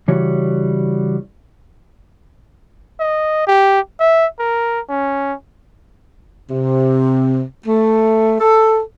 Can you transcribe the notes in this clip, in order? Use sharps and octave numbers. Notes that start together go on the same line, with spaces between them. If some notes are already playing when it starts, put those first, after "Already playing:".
C#3 E3 G3 F#4 C#5
D#5
G4
E5
A#4
C#4
C3
A3
A4